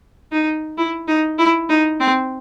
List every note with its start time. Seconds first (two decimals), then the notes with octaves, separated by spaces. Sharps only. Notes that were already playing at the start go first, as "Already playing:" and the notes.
0.32 D#4
0.78 E4
1.08 D#4
1.39 E4
1.70 D#4
2.00 C4